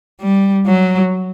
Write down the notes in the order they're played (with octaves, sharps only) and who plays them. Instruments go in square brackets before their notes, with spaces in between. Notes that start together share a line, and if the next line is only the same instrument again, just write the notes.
[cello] G3
F#3